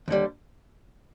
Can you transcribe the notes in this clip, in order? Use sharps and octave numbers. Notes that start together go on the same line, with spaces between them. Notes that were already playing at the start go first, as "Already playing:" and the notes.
D#2 D3 G3